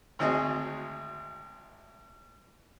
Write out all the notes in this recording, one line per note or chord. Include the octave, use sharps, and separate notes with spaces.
G#1 D2 C4 F#4 G#4 D#5